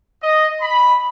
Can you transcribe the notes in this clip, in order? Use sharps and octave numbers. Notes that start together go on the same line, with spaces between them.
D#5
B5